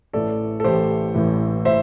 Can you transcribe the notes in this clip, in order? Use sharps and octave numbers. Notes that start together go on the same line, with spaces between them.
A1 A2 E3 A4 D5
A4
A1 A2 E3 G4 C5
A1 A2 E3
A2 C5 E5